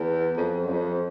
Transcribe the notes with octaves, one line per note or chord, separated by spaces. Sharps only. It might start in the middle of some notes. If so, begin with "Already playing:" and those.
Already playing: E2
F2
F#2
F2